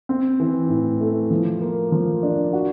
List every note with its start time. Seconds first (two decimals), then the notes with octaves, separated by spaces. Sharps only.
0.09 C4
0.40 E3
0.69 A2
1.01 A3
1.31 F3
1.61 A#3
1.92 F3
2.23 D4
2.53 F#4